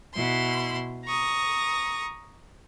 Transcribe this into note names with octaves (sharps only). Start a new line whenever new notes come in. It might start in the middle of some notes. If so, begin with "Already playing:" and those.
B2 E4 C6
A#5 C#6 D#6